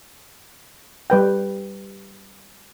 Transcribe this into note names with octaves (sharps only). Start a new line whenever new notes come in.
G3 B4 G5